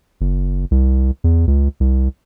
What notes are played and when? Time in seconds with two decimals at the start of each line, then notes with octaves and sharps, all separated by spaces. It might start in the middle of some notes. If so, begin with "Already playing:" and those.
0.21 F#1
0.71 C2
1.24 E2
1.47 C#2
1.80 C2